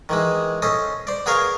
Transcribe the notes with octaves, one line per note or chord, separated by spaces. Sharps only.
D#3 E3 G#3
C#4 A4 C5 D#5
C5 D5
B3 G#4 A#4 C#5 F5